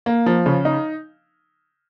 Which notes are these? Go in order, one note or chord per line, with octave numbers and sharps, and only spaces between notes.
A#3
F3
C#3
D#4